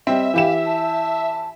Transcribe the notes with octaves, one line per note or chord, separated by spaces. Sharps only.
G3 C4 D#5 E5
E3 G4 F5 E7
A5